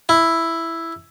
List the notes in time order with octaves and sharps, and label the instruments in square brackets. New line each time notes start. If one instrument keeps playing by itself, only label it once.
[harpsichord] E4